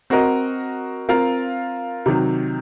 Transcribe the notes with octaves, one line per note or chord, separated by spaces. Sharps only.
C4 F#4 A#4 D#5
C4 F4 A#4 F5
C3 D#3 F#3